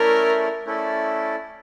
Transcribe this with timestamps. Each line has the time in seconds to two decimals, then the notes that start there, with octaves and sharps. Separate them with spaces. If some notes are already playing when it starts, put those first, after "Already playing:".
Already playing: A3 C#4 E4 A4 A#4 D5
0.65 A3 C#4 E4 A4 D5